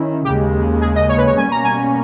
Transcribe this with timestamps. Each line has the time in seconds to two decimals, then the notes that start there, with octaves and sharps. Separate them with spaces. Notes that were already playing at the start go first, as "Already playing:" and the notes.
Already playing: D#3 C#4 E4
0.24 D#2 C#3 G#3 G4
0.81 G#4
0.96 D#5
1.09 C#5
1.18 B4
1.27 C#5
1.37 B2 G3 A#3 C#4 G#5
1.52 A#5
1.65 G#5